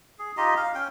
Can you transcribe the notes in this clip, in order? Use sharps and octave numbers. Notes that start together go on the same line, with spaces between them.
G#4
D#4 F4 G4 D#5
F5
C#4 G5